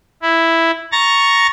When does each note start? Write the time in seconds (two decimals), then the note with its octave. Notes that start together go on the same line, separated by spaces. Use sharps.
0.22 E4
0.92 A#5 C#6 A6 A#6